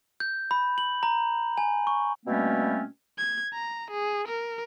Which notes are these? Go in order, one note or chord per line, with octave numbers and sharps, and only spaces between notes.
G6
B5
F#7
A#5
G#5
C#6
B2 G3 A3 A#3 C4 C#4
G#6
A#5
G#4
A#4